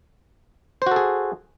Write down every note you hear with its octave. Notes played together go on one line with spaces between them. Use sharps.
F#4 G#4 A4 C5